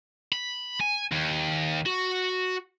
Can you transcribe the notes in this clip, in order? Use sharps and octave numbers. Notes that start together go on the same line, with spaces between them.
B5
G#5
D#2
F#4